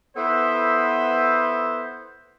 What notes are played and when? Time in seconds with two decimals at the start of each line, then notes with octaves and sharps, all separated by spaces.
0.16 B3 E4 A4 B4 C5